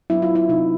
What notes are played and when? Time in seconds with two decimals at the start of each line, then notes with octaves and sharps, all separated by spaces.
0.10 F#3 B3 D4 E4
0.22 F4
0.35 E4
0.49 C3 D#4